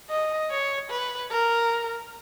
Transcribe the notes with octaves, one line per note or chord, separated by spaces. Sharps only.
D#5
C#5
B4
A#4